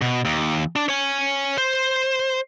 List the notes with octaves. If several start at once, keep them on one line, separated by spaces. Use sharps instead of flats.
B2
D#2
D4
C#5 G#5
C5